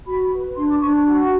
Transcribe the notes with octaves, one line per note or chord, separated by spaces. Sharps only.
F#4 B5
B4
D4 C6
D6
D4 C#6
F#4